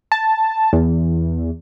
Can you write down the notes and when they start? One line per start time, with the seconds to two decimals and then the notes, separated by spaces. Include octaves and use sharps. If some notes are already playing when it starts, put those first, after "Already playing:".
0.12 A5
0.73 E2